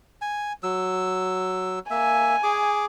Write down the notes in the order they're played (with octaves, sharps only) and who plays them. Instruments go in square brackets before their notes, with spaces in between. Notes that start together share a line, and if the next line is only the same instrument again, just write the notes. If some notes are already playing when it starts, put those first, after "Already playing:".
[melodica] G#5
F#3 E6
[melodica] A#3 E5 [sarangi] G#5
[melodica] G#4 D6